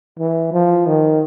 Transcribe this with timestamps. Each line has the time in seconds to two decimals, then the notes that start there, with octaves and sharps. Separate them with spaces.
0.19 E3
0.52 F3
0.86 D#3